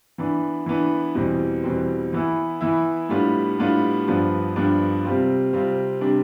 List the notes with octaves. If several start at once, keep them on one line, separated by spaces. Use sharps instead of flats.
E3 B3 D4
E3 B3 D4
E2 B2 G3 C4
E2 B2 G3 C4
E3 B3 E4
E3 B3 E4
A2 G3 B3 D4 F4
A2 G3 B3 D4 F4
G2 F3 B3 D4
G2 F3 B3 D4
C3 G3 C4 F4
C3 G3 C4 F4
C3 G3 D4